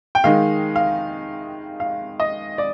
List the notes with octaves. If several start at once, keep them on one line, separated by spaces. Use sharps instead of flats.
G5
D#3 G#3 D#4 F5
F5
F5
D#5
D5